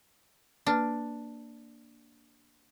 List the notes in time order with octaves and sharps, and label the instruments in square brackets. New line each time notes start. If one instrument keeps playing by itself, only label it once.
[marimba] A#3 B4 F6 [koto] D4